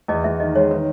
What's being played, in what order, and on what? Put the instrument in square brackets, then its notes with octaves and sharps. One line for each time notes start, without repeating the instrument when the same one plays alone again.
[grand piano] E2 [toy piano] D#5
[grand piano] E2 [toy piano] E5
[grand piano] D#3 [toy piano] D#5
[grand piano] G#3 [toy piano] C#5
[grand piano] D#3 [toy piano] B4